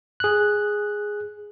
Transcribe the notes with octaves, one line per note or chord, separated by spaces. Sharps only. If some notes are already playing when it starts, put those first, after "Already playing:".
G#4 F#6